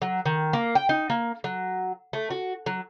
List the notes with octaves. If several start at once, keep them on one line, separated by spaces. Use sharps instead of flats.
F#3
D#3
A#3
G5
D#4
A#3
F#3
A3
F#4
F#3